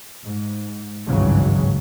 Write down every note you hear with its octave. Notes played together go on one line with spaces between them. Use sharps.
G#2
G#1 C#2 G2 C#3 E3 F#3